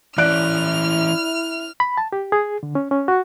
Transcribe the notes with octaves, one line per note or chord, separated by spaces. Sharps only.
E3 C#4 E4 D5 F6 F#6 D7
B5
A5
G4
G#4
D3
C#4
C#4
F#4